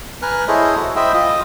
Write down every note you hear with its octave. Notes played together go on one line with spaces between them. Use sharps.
B4 G#5 A#5 F6 F#6
E4 G#4 A4 C5 C#5 D#5
F#4
C5 D#5 E5 G5 B5
F4 D#5